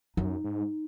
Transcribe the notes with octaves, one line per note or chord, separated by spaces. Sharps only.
F#2 D#4
G#2